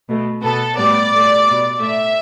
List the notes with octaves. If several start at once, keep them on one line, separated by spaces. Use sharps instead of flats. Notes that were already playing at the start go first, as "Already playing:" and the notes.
B2 A3
B2 B3 A4
A2 G3 B3 D5
A2 A3
B2 B3
A2 A3 E5